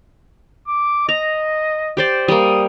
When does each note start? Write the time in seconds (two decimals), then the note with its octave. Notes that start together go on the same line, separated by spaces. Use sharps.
0.68 D6
1.09 D#5 A#5
1.97 G4 C5 D5
2.28 G3 A#3 D#6